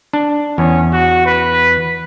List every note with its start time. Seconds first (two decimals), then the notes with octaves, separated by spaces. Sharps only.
0.13 D4
0.58 E2 C#4
0.93 F#4
1.26 B4